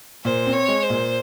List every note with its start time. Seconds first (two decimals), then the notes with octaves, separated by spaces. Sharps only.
0.24 A#2 C5
0.46 C4
0.53 C#5
0.68 G#3
0.83 C5
0.90 A#2